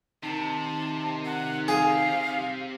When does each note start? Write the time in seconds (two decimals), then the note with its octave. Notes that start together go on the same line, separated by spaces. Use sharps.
0.23 C3 D#3 A5
1.25 F#5
1.68 G#4 F5